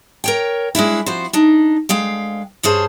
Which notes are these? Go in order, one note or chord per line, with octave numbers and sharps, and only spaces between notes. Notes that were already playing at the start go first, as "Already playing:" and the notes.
A#4 C#5 G5
G#3 C#4 D4 E4
F3 C4 F#4 C5
D4 D#4
D2 G#3 F5 G5
G2 C#4 G#4 C5 A5